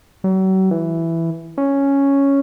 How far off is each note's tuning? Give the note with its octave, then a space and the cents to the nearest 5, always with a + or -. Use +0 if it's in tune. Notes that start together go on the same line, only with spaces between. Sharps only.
F#3 +40
E3 +5
C#4 +0